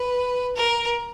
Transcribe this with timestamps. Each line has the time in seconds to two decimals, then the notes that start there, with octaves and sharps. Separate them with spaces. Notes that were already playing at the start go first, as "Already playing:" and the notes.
Already playing: B4
0.56 A#4